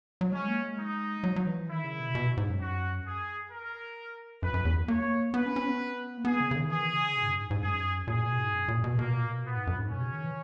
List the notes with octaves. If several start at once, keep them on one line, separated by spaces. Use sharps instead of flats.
F#3
G#3 C#4
A#3
G#3
D#4
F#3
F#3
E3
D#3 E4
C#3
B2
B2
G#2
F#2
F#4
G#4
A#4
F#2 B4
F#2
E2
A#3 C#5
B3 B4
C#4
C#4
B3
A#3
B3 G#4
C#3
C#3
D#3
E3 G#4
C#3
B2
G#2
F#2
G#2
G#2
F#2 G#4
A#2 G#4
B2
G#2
F#2
A#2
B2
B2 A#3
A#2
B2
A#2 B3
G#2
F#2
G#2
B2 C#4
C#3
D#3
E3